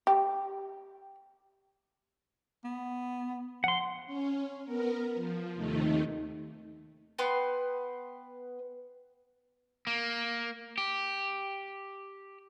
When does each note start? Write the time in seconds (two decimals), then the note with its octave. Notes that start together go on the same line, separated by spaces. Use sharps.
0.07 G4
2.64 B3
3.64 F3 F#5 C6
4.06 C#4
4.65 B3 A#4
5.14 F3
5.54 D#2 C3 D#3 A3 D#4
7.19 B3 B4 G5 C6
9.87 A#3
10.78 G4